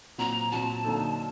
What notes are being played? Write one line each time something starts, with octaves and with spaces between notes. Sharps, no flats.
A#2 F#3 C4 F#4 A#5
A#2 F#3 C4 F#4 A5
D3 F#3 A#3 D#4 A4